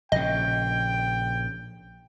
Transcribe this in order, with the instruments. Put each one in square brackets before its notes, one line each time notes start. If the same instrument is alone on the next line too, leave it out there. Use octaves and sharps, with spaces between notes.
[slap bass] A#1 C#3 [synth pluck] D#5 [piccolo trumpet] G5